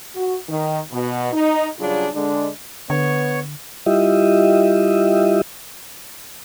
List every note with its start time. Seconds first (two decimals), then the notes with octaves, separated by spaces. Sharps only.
0.16 F#4
0.49 D#3
0.92 B2
1.33 D#4
1.79 C#3 F#3 G3 D4 F4 G#4
2.14 D3 G#3 D4
2.90 D3 B3 C#5 C#6
3.86 G3 E4 F4 G4 D#5 E5